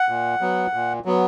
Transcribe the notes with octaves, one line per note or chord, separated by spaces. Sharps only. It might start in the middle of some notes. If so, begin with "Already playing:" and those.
Already playing: F#5
A#2
F#3 B3
A#2
F#3 B3